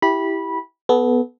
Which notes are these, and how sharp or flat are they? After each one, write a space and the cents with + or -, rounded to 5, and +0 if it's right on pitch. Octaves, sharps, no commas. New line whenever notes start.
E4 +0 G4 +0 B5 -15
B3 +0 A4 -35